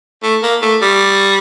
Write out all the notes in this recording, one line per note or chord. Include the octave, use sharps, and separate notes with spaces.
A3
A#3
A3
G3